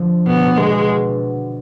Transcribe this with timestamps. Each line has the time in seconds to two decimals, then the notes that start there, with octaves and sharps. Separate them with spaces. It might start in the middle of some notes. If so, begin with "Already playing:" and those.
Already playing: D3 F3
0.26 B2 B3
0.34 D3
0.43 B2
0.57 D3 G#3
0.67 B2
0.73 D3